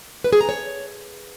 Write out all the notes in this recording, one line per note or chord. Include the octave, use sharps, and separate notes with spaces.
B4
G#4
A#5
C#5